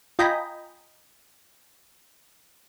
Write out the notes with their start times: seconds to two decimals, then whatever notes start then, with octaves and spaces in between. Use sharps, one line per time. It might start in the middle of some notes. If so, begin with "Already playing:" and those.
0.19 F4 D#5 G5 G#5 A#5 B5